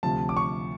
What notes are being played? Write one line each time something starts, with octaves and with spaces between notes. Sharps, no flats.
D2 C3 F3 A5
D6
C#6